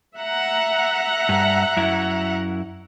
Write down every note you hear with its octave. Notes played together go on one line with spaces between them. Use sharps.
E5 F#5 A#5
G2
F#2 E4